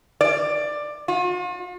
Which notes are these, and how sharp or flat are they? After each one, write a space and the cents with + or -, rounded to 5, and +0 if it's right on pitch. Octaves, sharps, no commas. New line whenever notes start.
D5 +15
F4 +45